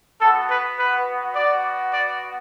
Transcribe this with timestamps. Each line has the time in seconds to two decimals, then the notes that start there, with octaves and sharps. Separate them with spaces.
0.21 B3 A4
0.25 F#4
0.50 B4
0.78 B4
1.35 B3 F#4 D5
1.94 D5